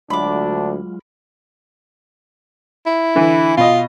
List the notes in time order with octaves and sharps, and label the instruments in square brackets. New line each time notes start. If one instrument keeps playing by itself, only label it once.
[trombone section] D2 [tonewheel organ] F#3 G#3 F4 [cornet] D4 [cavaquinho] B5 D6
[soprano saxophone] E4
[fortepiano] D3 E3
[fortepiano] B2 D#5 [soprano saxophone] F4